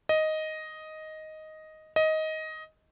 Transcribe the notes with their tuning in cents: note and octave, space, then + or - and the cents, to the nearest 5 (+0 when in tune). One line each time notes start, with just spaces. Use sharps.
D#5 +5
D#5 +15